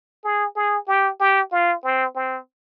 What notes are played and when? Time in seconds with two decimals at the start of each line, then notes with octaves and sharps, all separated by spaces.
0.24 G#4
0.56 G#4
0.88 G4
1.20 G4
1.52 F4
1.84 C4
2.15 C4